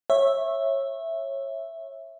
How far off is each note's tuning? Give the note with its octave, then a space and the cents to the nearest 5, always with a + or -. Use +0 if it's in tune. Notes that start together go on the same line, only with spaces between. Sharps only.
C#5 -20 E5 +0